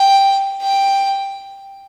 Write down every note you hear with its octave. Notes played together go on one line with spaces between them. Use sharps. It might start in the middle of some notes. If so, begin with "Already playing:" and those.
Already playing: G5
G5